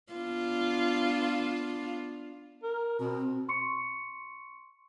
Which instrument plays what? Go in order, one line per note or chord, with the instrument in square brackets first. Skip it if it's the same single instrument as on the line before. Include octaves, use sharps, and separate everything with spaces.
[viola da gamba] B3 D4 F4
[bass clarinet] A#4
[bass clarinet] B2 [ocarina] C4
[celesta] C6 C#6 C#7